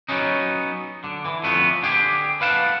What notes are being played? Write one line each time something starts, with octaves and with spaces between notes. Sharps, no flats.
F#3 B3 C#4 D#4
D3
E3
F2 D3 A3 B3
D3 G4 G#4
B4 F5 F#5 A5